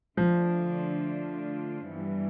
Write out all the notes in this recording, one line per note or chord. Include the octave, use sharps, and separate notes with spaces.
D3 F3 A3 D4 F4
G2 E3 G3 B3